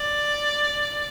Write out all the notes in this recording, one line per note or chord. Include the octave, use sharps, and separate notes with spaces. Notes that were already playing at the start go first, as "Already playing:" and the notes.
Already playing: D5